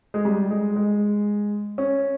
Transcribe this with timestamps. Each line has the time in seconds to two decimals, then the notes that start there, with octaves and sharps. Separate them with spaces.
0.14 G#3
0.25 G3
0.51 G#3
0.76 G#3
1.78 C#4